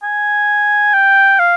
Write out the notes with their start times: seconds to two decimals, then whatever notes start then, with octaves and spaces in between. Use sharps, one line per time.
0.03 G#5
0.94 G5
1.39 F5